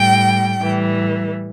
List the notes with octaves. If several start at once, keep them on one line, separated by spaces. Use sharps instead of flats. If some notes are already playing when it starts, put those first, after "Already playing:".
Already playing: A2 G3 G5
A2 E3 G3